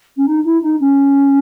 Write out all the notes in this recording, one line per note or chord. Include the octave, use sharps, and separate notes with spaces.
C#4
D#4
E4
D#4
C#4